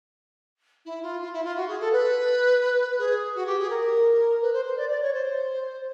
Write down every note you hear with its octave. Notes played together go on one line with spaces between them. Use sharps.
E4
F4
F4
E4
F4
F#4
G#4
A4
B4
G#4
F#4
G4
G#4
A#4
B4
C5
C5
D5
D5
C#5
C5